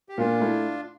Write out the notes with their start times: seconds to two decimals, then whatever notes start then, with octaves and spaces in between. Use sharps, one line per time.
0.09 G4
0.17 A#2 D4 F4
0.40 A3 E4